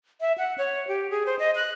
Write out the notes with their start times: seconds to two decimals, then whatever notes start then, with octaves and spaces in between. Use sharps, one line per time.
0.21 E5
0.38 F#5
0.58 C#5
0.88 G4
1.10 G#4
1.26 C5
1.39 D#5
1.56 F#6